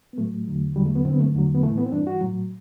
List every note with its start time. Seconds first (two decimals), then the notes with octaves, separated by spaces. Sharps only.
0.13 B3
0.18 A2 F#3 A3
0.47 E2 D3 F#3
0.76 E2 D3 F#3 G3
0.86 A3
0.95 B3
1.05 G2 D3 F#3 C4
1.13 B3
1.20 A3
1.34 E2 D3 F#3
1.55 B3
1.63 A2 E3 A3
1.78 B3
1.86 C4
1.92 G2 E3 D4
2.07 F#4
2.21 A2 F#3